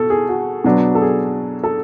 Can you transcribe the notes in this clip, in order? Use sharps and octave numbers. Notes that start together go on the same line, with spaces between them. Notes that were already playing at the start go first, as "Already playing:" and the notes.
Already playing: B2 A4
G#4
F#4
B2 F#3 B3 D4
A4
G#4
A4